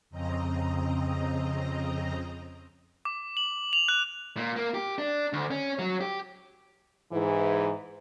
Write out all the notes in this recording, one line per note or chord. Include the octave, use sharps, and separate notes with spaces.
F2 C#3 C4 D#5 A#5
D6
F#7
F7
F#6
A#2
A#3
G4
D4
D2
C#4
F#3
G4
G#2 E3